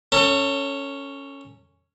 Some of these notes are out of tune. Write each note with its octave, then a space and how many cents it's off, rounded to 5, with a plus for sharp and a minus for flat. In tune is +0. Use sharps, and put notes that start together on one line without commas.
C#4 +0 A4 +35